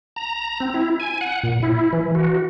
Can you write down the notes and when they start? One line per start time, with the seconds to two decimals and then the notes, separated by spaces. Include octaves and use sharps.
0.16 A#5
0.60 C4
0.74 E4
1.00 G#5
1.21 F#5
1.43 A#2
1.63 E4
1.93 E3
2.15 F#4